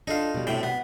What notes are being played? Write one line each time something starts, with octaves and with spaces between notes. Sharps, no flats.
D4 D#4 F4 A4
B2 G3
A2 C3 G5
B3